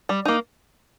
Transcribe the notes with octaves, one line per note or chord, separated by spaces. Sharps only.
G3
A#3 D#4